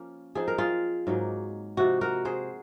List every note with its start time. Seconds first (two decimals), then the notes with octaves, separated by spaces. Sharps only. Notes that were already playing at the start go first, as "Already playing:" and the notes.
Already playing: F3 A#3 C#4
0.35 F3 C4 D#4 G#4
0.48 A#4
0.58 F4 G#4
1.07 G#2 F#3 A#3 D#4
1.77 C3 F3 C4 D#4 F#4
2.01 F#4 A#4
2.25 G#4 C5